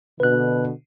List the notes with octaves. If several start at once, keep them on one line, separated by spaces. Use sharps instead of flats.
B2 D3 B4 F#6